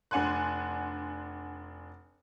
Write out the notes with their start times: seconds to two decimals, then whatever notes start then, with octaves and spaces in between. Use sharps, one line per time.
0.11 F1 D4 F#5 G#5 C6 F#6